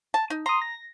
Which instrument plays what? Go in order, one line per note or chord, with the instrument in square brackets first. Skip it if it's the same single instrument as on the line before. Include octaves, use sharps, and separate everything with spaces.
[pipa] A5
D#4
[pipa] A#5 [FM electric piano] C6 D#6
[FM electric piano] A#6